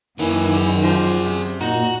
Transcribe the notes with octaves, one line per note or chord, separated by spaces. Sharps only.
F#2 D#3 E3 A#3 C#4
G#4 D5
F3
C3
A#2 D#4 F#4